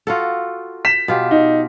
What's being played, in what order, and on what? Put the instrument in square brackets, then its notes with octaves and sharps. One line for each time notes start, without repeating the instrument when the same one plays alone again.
[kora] F4 F#4 A4
[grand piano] B6 E7
[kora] B2 F4 G4
[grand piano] D#4